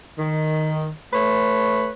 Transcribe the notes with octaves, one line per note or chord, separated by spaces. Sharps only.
D#3
A3 B4 C#5